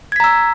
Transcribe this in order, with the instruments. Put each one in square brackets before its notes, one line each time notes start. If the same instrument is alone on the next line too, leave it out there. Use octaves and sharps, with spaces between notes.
[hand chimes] G#6
B6
A#5
E6